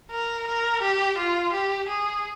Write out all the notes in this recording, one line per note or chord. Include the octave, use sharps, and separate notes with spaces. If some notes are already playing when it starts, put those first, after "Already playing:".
A#4
A#4
G4
F4
G4
G#4